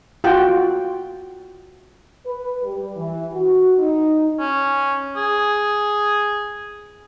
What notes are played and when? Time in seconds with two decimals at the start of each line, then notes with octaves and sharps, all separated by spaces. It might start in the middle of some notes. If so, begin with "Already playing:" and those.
0.24 F4 F#4 G5
2.26 B4
2.63 G3
2.96 E3
3.32 F#4
3.78 D#4
4.40 C#4
5.16 G#4